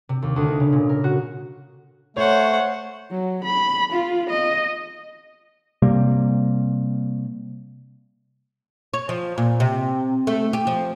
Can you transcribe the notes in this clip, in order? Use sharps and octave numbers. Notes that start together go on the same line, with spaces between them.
C3
D#2
D2
D#4
C#3
A#2
A#4
F#4
A3 C5 C#5 F#5
F#3
B5
F4
D#5
C3 G3 A#3
C#5
F3
A#2
C3
A3
G4
F3